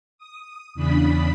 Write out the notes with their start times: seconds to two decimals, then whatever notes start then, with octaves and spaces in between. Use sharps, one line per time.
0.18 D#6
0.75 E2 C#3 D4 B5 D#6 B6